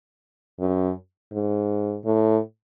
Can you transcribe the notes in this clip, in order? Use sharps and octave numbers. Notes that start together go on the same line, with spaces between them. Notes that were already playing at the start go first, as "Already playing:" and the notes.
F#2
G#2
A2